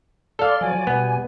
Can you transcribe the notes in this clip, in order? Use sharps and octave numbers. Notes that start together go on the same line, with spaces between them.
A4 D5 F5 C6
F3 F#3 D5 G#5
B2 G3 B3